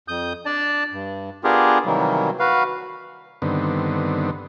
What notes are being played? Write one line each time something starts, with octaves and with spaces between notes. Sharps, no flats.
F2 D#6 G6
D4 D5 A5
G2
B3 D4 F4 G4 G#4 A#4
C3 D#3 E3 F#3 G3 A#3
F#4 B4 F5
G2 D3 D#3 B3 C4